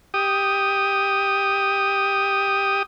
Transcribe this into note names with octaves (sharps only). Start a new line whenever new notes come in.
G4 D#6